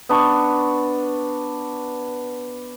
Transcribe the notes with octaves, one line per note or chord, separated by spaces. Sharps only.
B3 D4 C#6